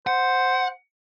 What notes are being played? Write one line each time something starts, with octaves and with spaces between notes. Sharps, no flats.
C5 F#5